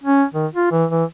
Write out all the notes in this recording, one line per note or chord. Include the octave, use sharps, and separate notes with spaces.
C#4
D#3
F4
E3
E3